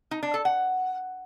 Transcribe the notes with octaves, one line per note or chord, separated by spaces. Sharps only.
D#4
D4
A4
F#5